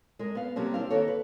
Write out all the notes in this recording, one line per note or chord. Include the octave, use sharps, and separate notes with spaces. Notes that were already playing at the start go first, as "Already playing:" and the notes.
G#3 A#4
B3 F5
C3 F#3 G3 A#3 C4 C#4
D4 E4 C5 F5
D#3 A#3 F#4 A4 C#5
B4